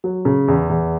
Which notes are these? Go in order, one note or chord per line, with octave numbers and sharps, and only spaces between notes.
F#3
C#3
E2
E2